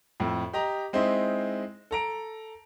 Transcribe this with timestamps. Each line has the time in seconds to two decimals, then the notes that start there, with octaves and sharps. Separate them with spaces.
0.20 F2 A2
0.53 G4 D#5 A#5
0.93 G#3 C4 D#4 E4 C5
1.91 A4 A#5 D7